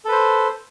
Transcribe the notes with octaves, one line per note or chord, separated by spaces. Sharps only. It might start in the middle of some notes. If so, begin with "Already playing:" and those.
A4 B4 C5